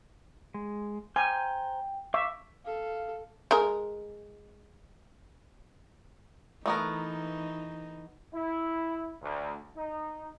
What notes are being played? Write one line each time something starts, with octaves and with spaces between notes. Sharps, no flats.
G#3
C5 G5 G#5 A#5 G6
E5 F5 C#6 D6
A4 F5
G#3 A#4
E3 A3 B3 D#4 A#4
E4
D2
D#4